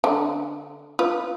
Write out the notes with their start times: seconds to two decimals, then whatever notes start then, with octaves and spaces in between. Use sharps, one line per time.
0.04 D3
0.99 F4 B4